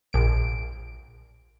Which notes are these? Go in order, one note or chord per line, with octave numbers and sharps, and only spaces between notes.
A#1 D7